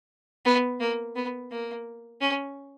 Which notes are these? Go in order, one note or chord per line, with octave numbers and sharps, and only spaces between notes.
B3
A#3
B3
A#3
C#4